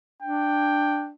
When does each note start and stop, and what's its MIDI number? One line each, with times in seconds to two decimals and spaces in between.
0.22 1.12 62
0.22 1.09 79